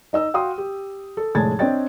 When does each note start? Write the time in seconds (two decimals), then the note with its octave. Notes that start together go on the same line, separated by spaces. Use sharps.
0.13 D#4 D#5 E6
0.34 F#4 F5 G5 C6 D#6
0.58 G4
1.17 A4
1.35 F1 A2 G#3 A5 G#6 A6
1.59 C4 D4 C#5 D#5 G5 A6